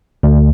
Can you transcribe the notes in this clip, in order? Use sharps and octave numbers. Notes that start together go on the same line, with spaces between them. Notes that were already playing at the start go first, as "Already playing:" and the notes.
D2